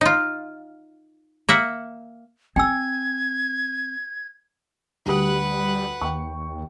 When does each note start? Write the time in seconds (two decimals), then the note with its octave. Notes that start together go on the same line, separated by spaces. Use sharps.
0.01 D#4 F4
1.49 A#3 E5 F#5
2.56 C4 G5 G#5 E6 G#6
5.06 D2 G3 G4 B4 F#5 D#6
6.01 D#2 G5 C#6